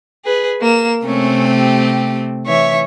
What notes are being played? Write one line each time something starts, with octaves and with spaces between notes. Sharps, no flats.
G#4 B4
A#3 E7
C3 A3 C4 C#4
G4
E3 C#5 E5